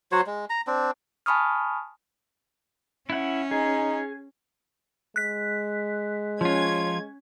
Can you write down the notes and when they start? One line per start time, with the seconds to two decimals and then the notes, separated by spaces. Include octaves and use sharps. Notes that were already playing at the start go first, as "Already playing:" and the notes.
0.12 F#3 F#4 C5 C#5
0.27 G#3
0.50 A#5
0.67 C4 D4
1.26 G#5 A5 B5 C#6 D#6 F6
3.10 C#4 E4 F#5
3.51 D#4 G#4
5.16 G#3 F#6 B6
6.41 F3 C#4 F4 G#6